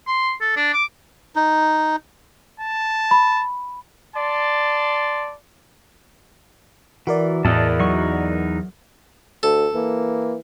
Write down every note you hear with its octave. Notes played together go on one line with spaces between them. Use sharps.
C6
A4
D4
D6
D#4
A5
B5
D5 A5 C6
E3 F#4 A#4 D5
E2 A2 D#5 A5
F#3 D#4 F#5 C#6
D2 A4
E3 A#3